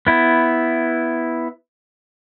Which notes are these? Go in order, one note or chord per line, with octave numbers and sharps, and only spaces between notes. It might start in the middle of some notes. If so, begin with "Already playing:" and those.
B3 E4